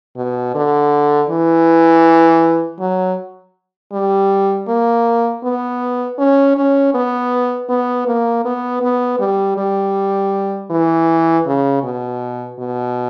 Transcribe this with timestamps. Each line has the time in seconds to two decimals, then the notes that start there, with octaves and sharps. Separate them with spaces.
0.16 B2
0.55 D3
1.29 E3
2.80 F#3
3.93 G3
4.68 A#3
5.44 B3
6.19 C#4
6.56 C#4
6.94 B3
7.69 B3
8.07 A#3
8.45 B3
8.82 B3
9.19 G3
9.57 G3
10.71 E3
11.46 C#3
11.83 B2
12.59 B2